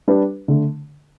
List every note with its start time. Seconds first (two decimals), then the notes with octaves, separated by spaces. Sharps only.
0.08 G3 D4 G4 B4
0.48 D3 A3